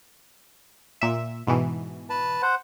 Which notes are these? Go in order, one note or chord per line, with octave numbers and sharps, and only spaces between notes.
A#2 E5
G#2 B2 E3
B4 A5
C5 F#5